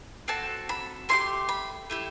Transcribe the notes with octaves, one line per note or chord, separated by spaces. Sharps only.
C4 F#4 A4 A5
B5
A3 E4 G4 C6
B5
A3 E4 G4